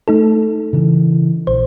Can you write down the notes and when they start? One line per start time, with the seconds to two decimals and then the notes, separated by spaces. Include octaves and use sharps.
0.08 A3 D#4 A4
0.73 C#3 E3
1.47 A#1 C5